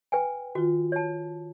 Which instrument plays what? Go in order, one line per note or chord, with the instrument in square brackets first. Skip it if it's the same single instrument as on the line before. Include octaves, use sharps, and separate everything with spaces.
[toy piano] B4 G5 G#5
[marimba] D#3 F4 [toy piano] F#4
[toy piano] C#5 A5